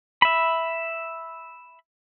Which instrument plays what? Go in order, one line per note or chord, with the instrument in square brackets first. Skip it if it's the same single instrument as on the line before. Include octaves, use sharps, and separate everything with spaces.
[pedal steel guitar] E5 B5